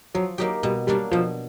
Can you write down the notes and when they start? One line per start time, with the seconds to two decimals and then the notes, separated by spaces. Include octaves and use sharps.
0.15 F3 F#3
0.38 F#3 A#3 D#4 G4
0.63 B2 G3
0.87 F#3 G3 A#3 D4
1.12 B2 F3